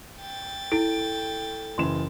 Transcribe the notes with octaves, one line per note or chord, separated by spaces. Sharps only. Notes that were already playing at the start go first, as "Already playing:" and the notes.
G5 A6
E4 A4 D7
F#1 E3 C6 E7